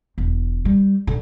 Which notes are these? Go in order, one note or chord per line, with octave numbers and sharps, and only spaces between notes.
E1
G3
D3